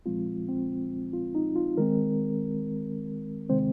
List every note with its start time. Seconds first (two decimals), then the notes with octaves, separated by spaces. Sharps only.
0.06 A#2 F3 G#3 C4 F4
0.48 C4
1.13 F4
1.35 D#4
1.56 F4
1.77 D#3 G#3 C4 A#4
3.49 C3 D#3 G#3 C4 C5